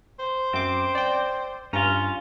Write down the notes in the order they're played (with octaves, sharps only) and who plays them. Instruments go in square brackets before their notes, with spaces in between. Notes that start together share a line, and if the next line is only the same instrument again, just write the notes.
[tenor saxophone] C5
[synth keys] F#2 D6 [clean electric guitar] C4
[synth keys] D5 G5
[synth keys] G2 A#5 [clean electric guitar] C#4 F4